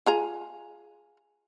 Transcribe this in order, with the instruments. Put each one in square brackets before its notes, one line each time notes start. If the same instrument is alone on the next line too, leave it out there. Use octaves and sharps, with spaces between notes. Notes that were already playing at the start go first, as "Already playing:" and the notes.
[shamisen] F4 G#4 A#5